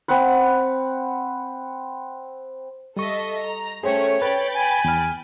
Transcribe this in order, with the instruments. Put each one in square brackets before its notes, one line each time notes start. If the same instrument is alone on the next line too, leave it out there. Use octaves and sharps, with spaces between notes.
[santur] C4 F#5 B5
[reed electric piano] G3 C#6 [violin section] A4 D#5 E5
[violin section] A#5
[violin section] A3 C#4 [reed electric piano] G#4 C5 G5 [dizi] C#5
[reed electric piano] B4 [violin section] G5 B5 A6
[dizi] G#5
[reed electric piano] E2 F6